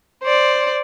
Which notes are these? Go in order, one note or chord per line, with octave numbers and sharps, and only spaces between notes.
C5 D5